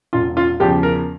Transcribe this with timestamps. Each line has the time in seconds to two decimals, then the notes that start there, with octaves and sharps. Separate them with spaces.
0.13 E1 F4
0.37 F4
0.60 E2 C#3 F3 G4
0.83 A#4